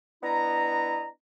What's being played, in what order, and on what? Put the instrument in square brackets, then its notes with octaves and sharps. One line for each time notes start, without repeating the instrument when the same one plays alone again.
[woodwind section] B3 D4 E4 D#5 A#5